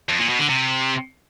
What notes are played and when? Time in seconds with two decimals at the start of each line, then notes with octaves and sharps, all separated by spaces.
0.09 F2
0.19 A#2
0.29 B2
0.38 D3
0.48 C3